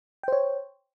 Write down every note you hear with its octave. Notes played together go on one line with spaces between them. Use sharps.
C5 C#5 G5